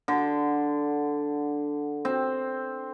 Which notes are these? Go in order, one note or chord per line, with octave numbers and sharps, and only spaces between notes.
D3
C4